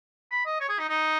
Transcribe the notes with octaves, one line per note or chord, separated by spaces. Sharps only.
B5
D#5
C#5
G#4
D#4
D#4